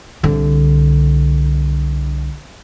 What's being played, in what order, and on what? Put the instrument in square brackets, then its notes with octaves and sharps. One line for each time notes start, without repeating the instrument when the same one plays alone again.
[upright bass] C2 D3